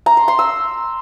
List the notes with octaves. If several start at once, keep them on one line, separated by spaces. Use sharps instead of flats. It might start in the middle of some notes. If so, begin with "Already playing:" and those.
A#5
C6
C6
E6